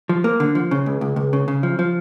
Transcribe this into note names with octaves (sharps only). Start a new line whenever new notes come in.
F3
A#3
D3
F3
C#3
C#2
C#2
C#2
C#3
C#3
F3
F3